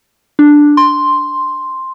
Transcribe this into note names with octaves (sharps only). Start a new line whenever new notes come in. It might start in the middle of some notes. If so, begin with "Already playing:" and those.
D4
C6